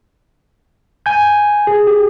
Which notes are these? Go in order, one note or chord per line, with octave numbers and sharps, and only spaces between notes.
G#5 G6
G#4
G4